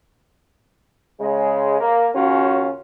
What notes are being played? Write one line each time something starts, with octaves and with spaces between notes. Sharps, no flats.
C#3 G#3
A#3
D#2 C#3 C#4 F4 F#4